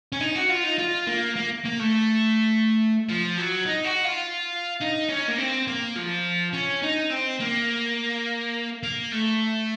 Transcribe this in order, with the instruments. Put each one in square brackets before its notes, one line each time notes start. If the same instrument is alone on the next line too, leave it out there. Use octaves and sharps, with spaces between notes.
[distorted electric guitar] C#4
D#4
F#4
F4
D#4
F4
A#3
A#3
A#3
A3
F3
F#3
D#4
F#4
F4
D#4
C#4
A#3
C4
A#3
F3
C#4
D#4
C4
A#3
A#3
A3